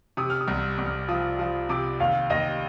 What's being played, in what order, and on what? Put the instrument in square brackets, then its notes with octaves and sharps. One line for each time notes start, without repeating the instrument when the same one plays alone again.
[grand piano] C3 [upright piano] D#6
[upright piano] F6
D#6
[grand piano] C2
C2
[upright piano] F6
[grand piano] F3 [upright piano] D#6
[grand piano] F3
[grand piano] C3 [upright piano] D6
[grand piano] D#2 [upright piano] F5
[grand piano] D#2 [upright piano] D#5